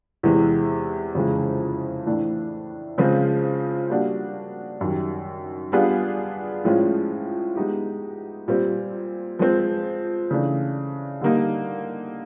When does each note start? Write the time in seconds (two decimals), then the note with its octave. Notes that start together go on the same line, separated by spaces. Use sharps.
0.23 E2 C3 E3 G#3
1.15 F2 C#3 E3 G#3
2.06 A2 E3 A3 D4
2.98 C#3 F3 G#3 C4 F4
3.90 G3 A#3 D4 F#4
4.81 F#2 D#3 G3
5.72 G3 B3 D4 F4 G#4
6.64 A2 F3 G#3 C#4 F4
7.56 G#3 B3 D#4 G4
8.48 A#2 G3 C4
9.39 F3 G#3 C4
10.31 C#3 E3 A3 D4
11.21 D3 G3 A#3 D#4